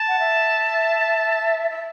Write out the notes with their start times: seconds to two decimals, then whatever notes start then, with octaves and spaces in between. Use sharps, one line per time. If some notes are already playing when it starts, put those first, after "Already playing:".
Already playing: A5
0.08 F#5
0.19 E5
1.71 E5